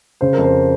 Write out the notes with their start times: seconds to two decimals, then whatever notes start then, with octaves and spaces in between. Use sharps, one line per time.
0.21 C#3 C5
0.33 F2 A#4
0.44 C5